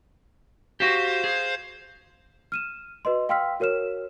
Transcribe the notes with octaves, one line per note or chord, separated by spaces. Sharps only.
F#4 G4 C5 F5
G#4
F6 D#7 E7
F#4 B4 D#5 C6
F5 G5 C6 E6 F6 B6
F#4 A#4 C#5 F6 E7